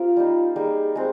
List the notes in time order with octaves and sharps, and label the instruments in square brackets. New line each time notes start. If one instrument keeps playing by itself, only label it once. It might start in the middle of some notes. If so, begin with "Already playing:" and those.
Already playing: [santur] C4 G4 A#4 [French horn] F4
[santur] G3 A#3 D#4
[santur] G3 A#3 D#4 [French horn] G#4
[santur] G#3 C4